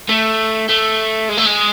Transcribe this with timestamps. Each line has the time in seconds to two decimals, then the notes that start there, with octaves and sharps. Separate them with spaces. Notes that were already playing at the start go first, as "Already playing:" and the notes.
0.09 A3
0.69 A3
1.29 G#3
1.38 A3
1.46 G#3